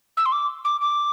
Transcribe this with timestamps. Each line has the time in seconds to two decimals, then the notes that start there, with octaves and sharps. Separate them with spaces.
0.17 E6
0.26 C6
0.32 D6
0.65 D6
0.81 D6